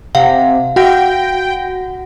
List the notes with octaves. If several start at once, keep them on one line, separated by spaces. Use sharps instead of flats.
C3 F5 F#5
F#4 F#5 G5 A#6